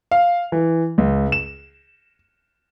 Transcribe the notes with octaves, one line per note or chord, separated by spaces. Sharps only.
F5
E3
C#2
E7